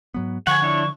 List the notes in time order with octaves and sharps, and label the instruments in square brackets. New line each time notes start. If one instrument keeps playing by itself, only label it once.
[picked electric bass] G#2 F#3 B3
[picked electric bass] D3 F3 [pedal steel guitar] F#5 G#5 [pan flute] C#6
[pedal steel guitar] D4 E4 C#5